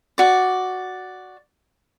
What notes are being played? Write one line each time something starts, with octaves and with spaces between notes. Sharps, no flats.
F#4 D5